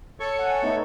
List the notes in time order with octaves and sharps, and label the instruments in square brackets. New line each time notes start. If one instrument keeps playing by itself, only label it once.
[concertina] A4 C#5 C#6 [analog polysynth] C#7
[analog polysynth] F#5 G#5
A3 B3 D#4